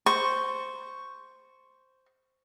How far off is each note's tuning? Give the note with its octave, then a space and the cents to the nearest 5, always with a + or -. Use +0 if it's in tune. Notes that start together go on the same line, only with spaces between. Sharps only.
C5 -5 C#6 +0